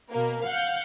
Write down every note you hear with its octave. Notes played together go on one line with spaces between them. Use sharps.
B2 A#3
F5 F#5 G6